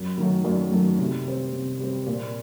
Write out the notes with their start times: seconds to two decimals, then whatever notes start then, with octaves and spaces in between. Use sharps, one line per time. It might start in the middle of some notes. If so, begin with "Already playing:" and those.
Already playing: F#2
0.18 D#3 F#3 A3
0.44 F#2 D5
0.71 D#3 F#3 A3
0.99 C3
1.26 G3 C4
1.52 C3
1.80 G3 C4
2.07 A#2